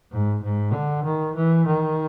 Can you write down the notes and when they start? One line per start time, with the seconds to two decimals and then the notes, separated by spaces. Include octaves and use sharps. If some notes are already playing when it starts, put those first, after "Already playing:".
0.11 G#2
0.42 G#2
0.73 D3
1.04 D#3
1.36 E3
1.67 D#3